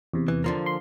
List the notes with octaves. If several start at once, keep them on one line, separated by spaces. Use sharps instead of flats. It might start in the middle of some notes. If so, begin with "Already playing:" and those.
E2 C3
E3
D3 F3 A#3
C6